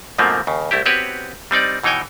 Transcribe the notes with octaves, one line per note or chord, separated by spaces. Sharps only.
G#2 B2 F3 A3 A#3 C4
D#2 C#3
C2 A3 E4 G4
B3 C4 F#4 G4 B4 C#5
G3 C4 D#4 D5
B2 E3 D#4 C#5 G5 G#5